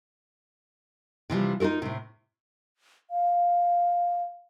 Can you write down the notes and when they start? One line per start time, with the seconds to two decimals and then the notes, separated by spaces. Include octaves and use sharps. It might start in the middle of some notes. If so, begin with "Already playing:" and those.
1.30 C3 E3 F3 G3
1.60 D#4 F4 F#4 A4 A#4
1.82 A2 C3
3.11 F5